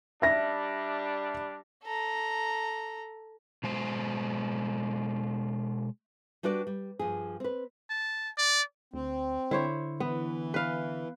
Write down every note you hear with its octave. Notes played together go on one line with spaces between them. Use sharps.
G3 D4 E5 A#6
A4 A#5
B2 G#3 C5
G3 D4 F#4 B4 D5
G3
G2 F3 G#4
C4 B4
A5
D5
D2 C4
D3 E4 C5 C#5
E3 B3
B4 F5